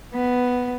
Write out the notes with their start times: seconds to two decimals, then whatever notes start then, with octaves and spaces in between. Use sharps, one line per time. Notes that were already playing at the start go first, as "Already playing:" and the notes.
0.14 B3